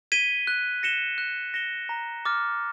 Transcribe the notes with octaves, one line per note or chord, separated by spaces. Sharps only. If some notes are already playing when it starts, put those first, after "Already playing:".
G#6 B6 D#7 G7
F#6
A#6 C#7 E7 G7
F#6
A#6 C#7 E7 G7
A#5
D6 F6 A6